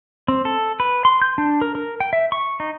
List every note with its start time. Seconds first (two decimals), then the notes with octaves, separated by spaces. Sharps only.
0.28 C4
0.45 A4
0.80 B4
1.05 C6
1.22 G6
1.38 D4
1.61 A#4
1.75 A#4
2.00 G5
2.13 E5
2.32 C#6
2.60 D#4